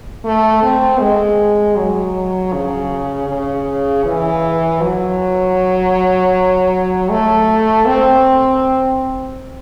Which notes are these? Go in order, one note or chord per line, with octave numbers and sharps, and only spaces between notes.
A3
C4
G#3
F#3
C#3
C#3
E3
F#3
A3
C4